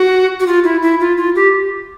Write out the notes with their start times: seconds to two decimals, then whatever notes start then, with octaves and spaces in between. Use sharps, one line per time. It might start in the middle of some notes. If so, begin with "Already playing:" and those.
Already playing: F#4
0.40 F#4
0.47 F4
0.64 E4
0.83 E4
1.00 F4
1.17 F4
1.36 G4